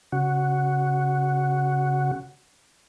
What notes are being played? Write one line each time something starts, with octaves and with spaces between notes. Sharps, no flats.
C#3 F#4